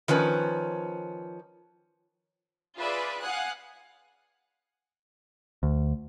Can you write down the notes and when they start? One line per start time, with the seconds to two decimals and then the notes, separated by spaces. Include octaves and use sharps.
0.08 D#3 F3 C#4 B4
2.77 F4 G#4 B4 D5 E5
3.22 F5 F#5 G#5 D#6 F#6
5.63 D2